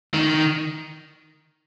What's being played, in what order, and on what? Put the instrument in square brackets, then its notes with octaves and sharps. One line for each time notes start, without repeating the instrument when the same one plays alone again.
[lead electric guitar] D#3